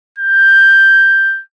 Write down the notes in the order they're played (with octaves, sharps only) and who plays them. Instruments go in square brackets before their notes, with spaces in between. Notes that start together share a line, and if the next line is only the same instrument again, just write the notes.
[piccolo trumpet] G6